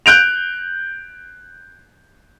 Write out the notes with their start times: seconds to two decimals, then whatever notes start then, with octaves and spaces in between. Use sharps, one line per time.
0.06 F#6 G6 D7 F7